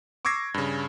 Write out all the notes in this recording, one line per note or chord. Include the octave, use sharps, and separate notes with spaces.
C#6 D6 E6 G#6 A#6 C7
G2 C#3